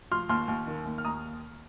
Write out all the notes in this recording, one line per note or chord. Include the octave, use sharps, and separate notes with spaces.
F3 C6 F6
D#2 C6 F6
D#2
D#3
D#2
F6
D#2 A#5 D#6